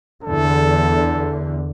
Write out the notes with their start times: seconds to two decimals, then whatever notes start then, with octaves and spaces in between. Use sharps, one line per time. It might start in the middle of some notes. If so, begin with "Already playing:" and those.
0.24 E2 D3 A4